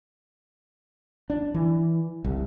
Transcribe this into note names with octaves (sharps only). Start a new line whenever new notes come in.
D4
E3
C2